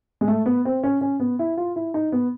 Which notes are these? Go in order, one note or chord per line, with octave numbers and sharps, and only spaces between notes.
G#3
A3
B3
C4
C#4
C#4
B3
E4
F4
E4
D#4
B3